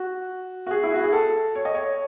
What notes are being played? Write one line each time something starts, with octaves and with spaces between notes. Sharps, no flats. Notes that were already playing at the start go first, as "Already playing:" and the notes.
Already playing: F#4
F#4
G#4
E4
F#4
G#4
A4
C#5
D#5
C#5